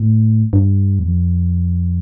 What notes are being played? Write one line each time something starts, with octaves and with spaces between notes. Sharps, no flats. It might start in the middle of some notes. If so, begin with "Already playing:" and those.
Already playing: A2
G2
E2
F2